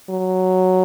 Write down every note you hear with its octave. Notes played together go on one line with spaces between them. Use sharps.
F#3